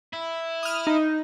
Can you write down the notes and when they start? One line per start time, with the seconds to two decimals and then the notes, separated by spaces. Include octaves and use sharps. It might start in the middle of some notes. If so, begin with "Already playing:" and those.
0.13 E4
0.63 D#6 F6
0.87 D#4